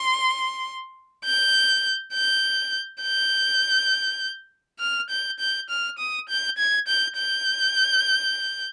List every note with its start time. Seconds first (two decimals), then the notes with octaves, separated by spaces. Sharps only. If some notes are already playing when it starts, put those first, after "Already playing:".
Already playing: C6
1.25 G6
2.13 G6
3.02 G6
4.80 F6
5.10 G6
5.39 G6
5.69 F6
5.99 D#6
6.29 G6
6.58 G#6
6.87 G6
7.18 G6